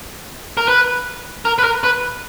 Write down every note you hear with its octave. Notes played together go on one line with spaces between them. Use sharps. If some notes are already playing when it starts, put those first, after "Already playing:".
A#4
B4
A#4
B4
A#4
B4